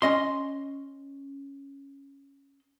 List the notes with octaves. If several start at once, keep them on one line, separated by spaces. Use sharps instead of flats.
C#4 D#5 C6